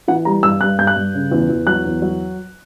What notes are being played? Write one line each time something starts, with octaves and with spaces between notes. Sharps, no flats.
E3 F#5
G3 A#5
G2 E6
G2 F#6
G2 G6
F#6
G2
C#3
E2
E2
F#3 F#6
E2
F#3